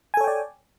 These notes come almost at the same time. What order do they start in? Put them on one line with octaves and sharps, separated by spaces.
G#5 A4 C#5 G5 D5